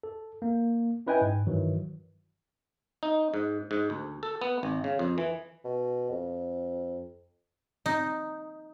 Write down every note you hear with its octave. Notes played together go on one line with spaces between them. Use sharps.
A4
A#3
C#4 E4 B4 D#5 G5 G#5
G#2
G2 D#3 E3 F#3
D#4
G#2
G#2
D2
A4
B3
G#1
C#3
F2
E3
B2
F2
D#4